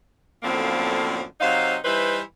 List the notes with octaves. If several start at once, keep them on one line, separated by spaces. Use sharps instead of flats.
F#2 A2 D3 F3 A#3 C4
C3 F#3 D#4 C5 F5
E3 G3 D#4 E4 B4 C5